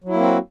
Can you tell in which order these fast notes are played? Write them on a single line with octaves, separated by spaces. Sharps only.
F#3 E4 A#3 C4 F#4